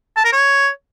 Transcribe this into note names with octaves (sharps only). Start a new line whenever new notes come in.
A5
A#4
C#5